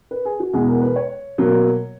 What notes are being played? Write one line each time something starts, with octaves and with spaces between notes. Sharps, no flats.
B4
G#4
F#4
E2 B2 G#3 G#4
A#4
B4
C#5
B2 F#3 A#3